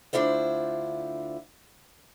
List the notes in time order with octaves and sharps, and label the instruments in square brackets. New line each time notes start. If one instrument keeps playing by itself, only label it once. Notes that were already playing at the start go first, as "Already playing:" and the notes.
[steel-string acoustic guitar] D2 D4 E4 F4 C5